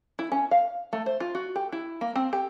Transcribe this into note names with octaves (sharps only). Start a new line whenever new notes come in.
E4
C#4
F5
A3
C5
F4
F#4
G4
E4
A#3
C4
G4